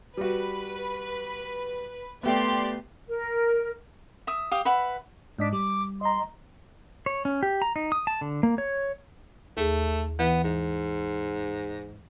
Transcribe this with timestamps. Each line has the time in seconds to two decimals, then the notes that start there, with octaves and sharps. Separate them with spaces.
0.17 G3 F#4 B4
2.23 A3 B3 G4 D5 C6
3.08 A#4
4.27 E5 D#6
4.51 G4 F5 D#6
4.65 B4 E5 F#5 B5
5.39 G#2 D4 D#5 B6
5.53 G3 D6
6.01 D#5 A#5 C6
7.06 C#5
7.25 C#4
7.43 G4
7.62 A#5
7.76 D#4
7.92 D#6
8.07 A5
8.21 D3
8.43 A#3
8.58 C#5
9.57 D#2 A3 G#4
10.19 E3 B3 E4
10.44 G#2